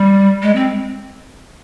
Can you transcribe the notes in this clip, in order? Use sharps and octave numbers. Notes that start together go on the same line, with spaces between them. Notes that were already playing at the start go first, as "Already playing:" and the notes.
Already playing: G3
G#3
C4